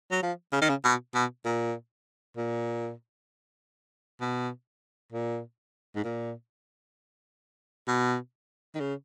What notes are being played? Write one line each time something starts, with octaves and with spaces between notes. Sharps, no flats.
F#3
F3
C#3
D#3
C#3
B2
B2
A#2
A#2
B2
A#2
G#2
A#2
B2
D#3
C#3